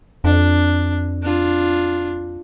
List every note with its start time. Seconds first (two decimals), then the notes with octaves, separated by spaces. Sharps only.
0.24 F2 D4
1.22 D4 F4